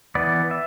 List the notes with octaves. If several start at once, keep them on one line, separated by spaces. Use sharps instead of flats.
E3 B3 D5
E5